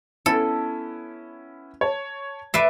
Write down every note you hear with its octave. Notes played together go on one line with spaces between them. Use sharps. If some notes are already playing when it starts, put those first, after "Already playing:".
B3 C#4 E4 A4
C#5 A5
B4 D5 E5 C7 D7